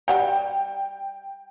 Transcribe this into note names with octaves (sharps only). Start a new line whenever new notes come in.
G3 F#5 G5 A#5